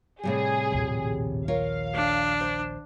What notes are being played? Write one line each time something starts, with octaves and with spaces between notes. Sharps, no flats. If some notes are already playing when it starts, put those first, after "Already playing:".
A2 C3 G3 G#4
A#1 D#2
F4 A#4 C#5 F5
D4
C5